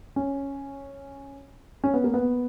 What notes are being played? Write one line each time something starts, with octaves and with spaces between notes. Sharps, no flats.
C#4
C#4
B3
A#3
B3